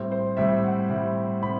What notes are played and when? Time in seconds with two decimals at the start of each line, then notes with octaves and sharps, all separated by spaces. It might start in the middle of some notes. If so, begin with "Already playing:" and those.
Already playing: A2 G3 C4
0.12 C5
0.37 A2 G3 C4 E5
0.64 F#5
0.89 A2 G3 C4
1.42 A2 G3 C4 B5